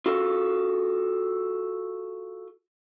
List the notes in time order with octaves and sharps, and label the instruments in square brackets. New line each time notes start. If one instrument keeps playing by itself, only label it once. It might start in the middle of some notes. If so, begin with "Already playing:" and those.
[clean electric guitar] F4 F#4 A4